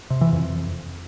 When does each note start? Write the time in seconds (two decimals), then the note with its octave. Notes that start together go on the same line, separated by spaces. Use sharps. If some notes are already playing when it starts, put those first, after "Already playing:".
0.10 C3
0.21 E3
0.32 F2